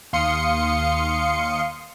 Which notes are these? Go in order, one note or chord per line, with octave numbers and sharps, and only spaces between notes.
D#2 F5 C6 D#6 C#7